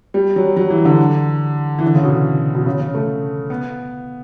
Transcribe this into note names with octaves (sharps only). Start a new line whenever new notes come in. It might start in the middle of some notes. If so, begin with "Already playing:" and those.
G3
F#3
F#3
E3
D3
E3
D3
C#3
B2
B2
C#3
C#3
A3
B3